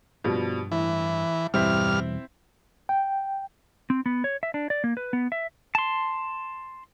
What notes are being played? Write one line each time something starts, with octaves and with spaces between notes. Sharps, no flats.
G2 B2 F3 G3
A2 E3
E2 G2 B2 G3 C4 E4 E5 F6
G5
C4
B3
C#5
E5
D4
D5
A#3
B4
B3
E5
A5 C6